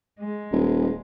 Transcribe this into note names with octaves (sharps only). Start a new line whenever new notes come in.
G#3
D#1